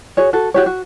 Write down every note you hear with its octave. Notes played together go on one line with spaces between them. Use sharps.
F#4 G#4 C#5
F#4 A4
F#4 G4 C#5
F#4